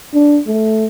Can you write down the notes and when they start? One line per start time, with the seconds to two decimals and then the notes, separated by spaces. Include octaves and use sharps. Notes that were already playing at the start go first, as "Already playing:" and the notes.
0.14 D4
0.47 A3